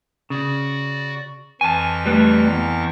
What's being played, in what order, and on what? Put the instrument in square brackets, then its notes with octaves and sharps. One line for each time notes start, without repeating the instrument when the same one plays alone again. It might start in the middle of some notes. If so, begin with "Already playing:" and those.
[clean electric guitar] C#3 [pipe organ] F#4 D5
[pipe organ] F2 E3 C#6 [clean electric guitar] G#5 A5
[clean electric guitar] G3 A3 B4
E2